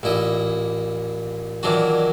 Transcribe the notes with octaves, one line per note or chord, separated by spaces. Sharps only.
A1 A#2 E4 D#5
A#2 D#3 E3 F#3 D4 F#4